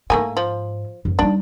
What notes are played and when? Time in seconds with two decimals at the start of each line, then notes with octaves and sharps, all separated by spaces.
0.10 G#2 A3 A#3 E4 G#5
0.37 F3
1.05 F#2
1.19 G3 D4 D#4